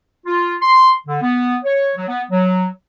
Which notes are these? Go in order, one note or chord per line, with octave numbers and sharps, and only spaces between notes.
F4
C6
D3
B3
C#5
F#3
B3
F#3